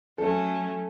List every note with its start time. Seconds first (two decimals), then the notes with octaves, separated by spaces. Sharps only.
0.18 F#3 A3 C#4 A4